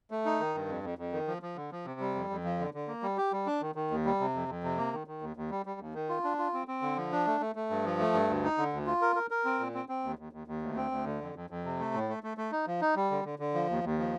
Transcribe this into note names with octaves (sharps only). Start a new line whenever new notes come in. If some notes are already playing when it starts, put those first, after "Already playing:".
A3
D#4
D#3
G2
F2
F2
F2
D#3
F3
F3
D3
F3
C3
G3
F2
F2
F3
D3
D3
A#3
G3
G4
G3
D4
D#3
D#3
D#2
G3
C3
F2
F2
C3
A#3
D#3
D#3
D#2
D#2
G3
G3
D#2
D#3
F4
D4
F4
C4
C4
D3
F3
D4
A3
A3
A3
G2
F3
A3
G2
D2
D#4
D3
D2
F4
A#4
A#4
A#4
C4
A#2
C4
C4
D#2
D#2
D#2
D#2
D2
C4
D2
D3
F2
F2
F2
C3
A3
A2
A3
A3
A3
D#4
F3
D#4
G3
D3
D3
D3
F3
D#2
D#2
F3